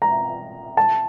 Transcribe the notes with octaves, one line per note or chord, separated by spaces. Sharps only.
A#5
A5